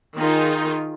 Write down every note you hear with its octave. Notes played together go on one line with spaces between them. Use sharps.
D#3 D#4 F4 G#4